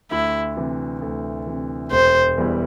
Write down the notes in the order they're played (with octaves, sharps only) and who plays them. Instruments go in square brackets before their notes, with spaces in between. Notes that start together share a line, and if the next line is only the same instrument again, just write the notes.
[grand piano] D2 [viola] E4
[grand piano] C3 E3
D2
C3 E3
[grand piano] E1 [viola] C5
[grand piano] E2 E3 G3 E4